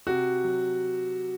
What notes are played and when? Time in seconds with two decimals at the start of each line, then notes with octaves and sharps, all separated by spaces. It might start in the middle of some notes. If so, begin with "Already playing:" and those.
0.07 C3 F#4
0.44 F#3